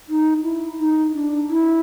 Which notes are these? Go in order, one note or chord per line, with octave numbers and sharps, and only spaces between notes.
D#4
E4
D#4
D4
E4